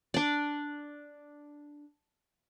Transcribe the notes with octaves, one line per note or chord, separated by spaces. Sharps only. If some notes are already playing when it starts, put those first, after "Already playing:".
D4 D5